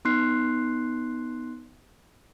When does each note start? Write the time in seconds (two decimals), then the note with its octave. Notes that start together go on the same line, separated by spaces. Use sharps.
0.05 B3 D#4 C6 F#6 C7